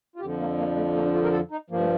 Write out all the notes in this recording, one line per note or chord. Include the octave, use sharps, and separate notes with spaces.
F4
F2 D3 F3 G4
A#3
A#3
A3
A#3
D4
F4
A#4
A4
D#4
G2 F3 A#3
A3